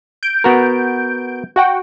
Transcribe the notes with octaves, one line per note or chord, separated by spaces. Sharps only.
G6 D7
B3 F#4 A#4
F#4 F#5 G5